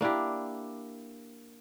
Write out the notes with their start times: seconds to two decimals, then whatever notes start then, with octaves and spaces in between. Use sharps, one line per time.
0.01 A#3 D4 E4 G4